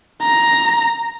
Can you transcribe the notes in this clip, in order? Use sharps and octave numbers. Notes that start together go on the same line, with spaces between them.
A#5